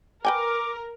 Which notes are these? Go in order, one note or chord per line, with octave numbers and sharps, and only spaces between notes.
A#4 B4 G5 G#5 D6